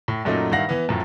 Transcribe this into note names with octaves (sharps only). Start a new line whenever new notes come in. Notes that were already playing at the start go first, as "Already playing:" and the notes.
A2
F#2 A#2 F#3 A3 C#4 D#4
G2 D#3 E4 F5 F#5 A#6
E3 B3
F#2 A2 F3